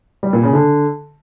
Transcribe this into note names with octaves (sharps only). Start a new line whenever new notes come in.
G3
A#2
C#3
D3